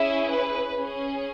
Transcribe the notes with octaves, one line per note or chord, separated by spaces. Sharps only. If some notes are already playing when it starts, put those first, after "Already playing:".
Already playing: C#4 E4 G#4 E5
B4
C#4 G#4